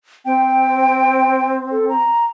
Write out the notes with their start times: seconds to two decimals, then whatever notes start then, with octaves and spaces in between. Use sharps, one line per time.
0.25 C4 G5
1.71 A4
1.89 A#5